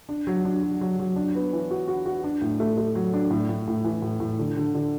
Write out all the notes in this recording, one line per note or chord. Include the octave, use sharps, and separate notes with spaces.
D4
F#3
D4
F#3
F#3
F#3
D4
B3
E3
F#4
F#4
F#4
D4
A2
A3
A3
F#3
D4
A2
A2
A2
E3
A2
A2
D3
D3
D3